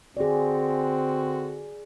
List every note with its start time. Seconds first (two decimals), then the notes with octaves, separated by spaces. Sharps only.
0.17 D3 C4 F#4 G#4 D5